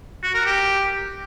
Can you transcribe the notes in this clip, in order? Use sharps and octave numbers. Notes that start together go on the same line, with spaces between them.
F#4
A#4
G4